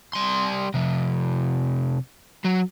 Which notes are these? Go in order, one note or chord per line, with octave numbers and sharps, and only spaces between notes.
G3 C6
C3 F3
F#3